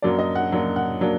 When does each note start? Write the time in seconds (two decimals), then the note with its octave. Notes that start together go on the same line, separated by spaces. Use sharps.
0.02 F#2 F#3 A#3 D4 D5
0.19 D#5
0.35 F#5
0.52 F#2 F#3 A#3 D4
0.76 F#5
1.01 F#3 A#3 D4